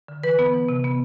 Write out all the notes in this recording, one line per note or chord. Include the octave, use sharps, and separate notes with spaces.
D3
E3 B4
B3
E3
C3
B3